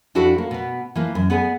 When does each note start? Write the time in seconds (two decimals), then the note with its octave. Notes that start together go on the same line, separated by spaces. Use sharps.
0.15 F2 D4 E4 F#4 A4 D5
0.38 A#3
0.51 B2 B3
0.96 E3 F3 A#3
1.15 F#2
1.30 B3 G#4 A4 D5 G#5